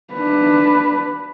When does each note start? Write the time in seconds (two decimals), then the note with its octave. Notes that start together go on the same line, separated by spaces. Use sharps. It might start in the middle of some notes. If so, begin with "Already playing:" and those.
0.14 D4 B4